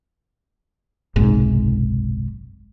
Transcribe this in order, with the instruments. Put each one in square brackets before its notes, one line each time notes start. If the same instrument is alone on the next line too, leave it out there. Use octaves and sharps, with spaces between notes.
[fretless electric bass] F#1 B1 G#2 C3